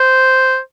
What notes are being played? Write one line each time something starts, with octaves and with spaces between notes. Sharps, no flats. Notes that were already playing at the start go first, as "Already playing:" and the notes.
Already playing: C5